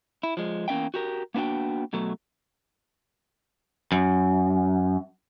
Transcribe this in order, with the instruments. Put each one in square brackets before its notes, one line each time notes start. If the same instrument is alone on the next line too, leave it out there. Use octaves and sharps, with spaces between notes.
[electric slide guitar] E4
F3 G#3
E2 A#3 C#4 E5 G5
F#4 G4 A#4
A#3 B3 D4 F#4 G5
B2 F#3 A3
[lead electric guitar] F#2